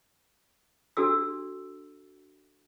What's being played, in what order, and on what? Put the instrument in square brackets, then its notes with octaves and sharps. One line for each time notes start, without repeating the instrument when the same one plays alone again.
[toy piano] D4 F#4 A4 E6